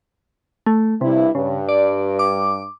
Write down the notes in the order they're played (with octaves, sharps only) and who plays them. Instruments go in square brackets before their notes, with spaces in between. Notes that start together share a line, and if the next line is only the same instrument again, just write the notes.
[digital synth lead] A3
[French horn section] G2 E4 [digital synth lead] C3
[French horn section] G2 [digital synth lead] C#3
[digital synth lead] D5
D6